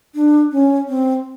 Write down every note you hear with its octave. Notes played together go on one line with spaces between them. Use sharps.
D4
C#4
C4